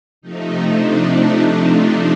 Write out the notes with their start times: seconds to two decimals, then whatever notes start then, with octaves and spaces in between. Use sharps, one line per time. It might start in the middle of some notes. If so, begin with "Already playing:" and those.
0.22 C3 F3 A3 D#4
0.68 D4